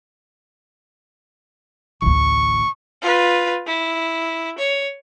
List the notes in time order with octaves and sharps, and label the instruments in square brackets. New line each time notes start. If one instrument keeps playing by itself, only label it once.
[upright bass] A1 D2 [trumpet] C#6
[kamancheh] F4 B4
E4
C#5